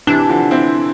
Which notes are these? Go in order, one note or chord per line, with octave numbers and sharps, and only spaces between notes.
C3 E3 D4
D3 F3
C4 E4